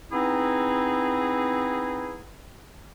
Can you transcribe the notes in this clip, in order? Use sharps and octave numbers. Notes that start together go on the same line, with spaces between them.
B3 C4 D#4 E4 G#4